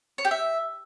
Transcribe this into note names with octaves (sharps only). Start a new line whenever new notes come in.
C#5
G4
E5